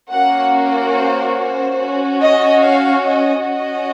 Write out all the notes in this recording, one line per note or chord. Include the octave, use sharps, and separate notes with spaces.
A#3 C#4 F#4 F#5
C5
C5
C#4 F#4
D#5
F5
D#5
C#4 F#4 D#5